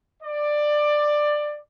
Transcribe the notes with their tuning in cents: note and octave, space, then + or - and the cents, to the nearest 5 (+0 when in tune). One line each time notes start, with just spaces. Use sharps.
D5 +15